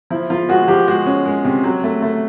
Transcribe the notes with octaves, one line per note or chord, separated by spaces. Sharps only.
F3 E4
F3 F4
G#3 F#4
F3 G4
G#3 F#4
C#4
G#3
C3
F#3
A3
A3